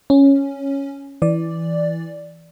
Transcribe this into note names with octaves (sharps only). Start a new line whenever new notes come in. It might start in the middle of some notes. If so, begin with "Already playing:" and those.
C#4
E3 D5